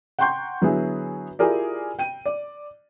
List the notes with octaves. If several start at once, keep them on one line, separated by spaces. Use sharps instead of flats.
F#5 G5 A#5 C6 C#6 G6
D3 F#3 B3 E4 F#4 G#4
E4 F4 G4 G#4 A#4 D5
G5 D#7
D5